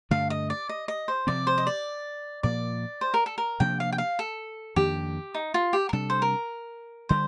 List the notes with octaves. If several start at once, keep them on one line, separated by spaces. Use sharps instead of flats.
G2 D3 A3 D4 F5
D#5
D5
D#5
D#5
C5
C3 F3 C4 D5
C5
D#5
D5
A#2 F3 A#3 D5
C5
A#4
A4
A#4
C3 F3 A#3 D4 G5
F5
G5
F5
A4
F2 D#3 A#3 D4 G4
D#4
F4
G4
A#4
C3 G3 D4 A4
C5
A#4
D3 G3 C5